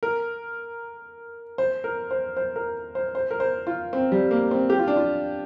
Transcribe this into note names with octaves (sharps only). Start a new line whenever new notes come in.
A#4
C5
A#4
C5
C5
A#4
C5
C5
A#4
C5
F4
C4
G3
A#3
C4
G4
F4
D4
F4